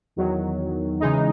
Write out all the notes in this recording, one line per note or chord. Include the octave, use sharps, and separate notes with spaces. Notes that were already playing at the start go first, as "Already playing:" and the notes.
E2 D#3 F#3
C#3 E3 G#3 D#4